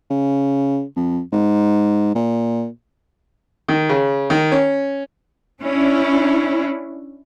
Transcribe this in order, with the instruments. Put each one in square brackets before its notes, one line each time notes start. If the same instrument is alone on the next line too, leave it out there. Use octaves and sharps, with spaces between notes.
[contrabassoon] C#3
F2
G#2
A#2
[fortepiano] D#3
C#3
D#3
C#4
[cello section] C#4 D4 E4